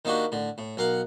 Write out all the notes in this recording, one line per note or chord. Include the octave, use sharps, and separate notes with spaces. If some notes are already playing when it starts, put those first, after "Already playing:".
D#3 A#3 D4 F#4 G4
A2 D3
A2
B1 A#4 F5 F#5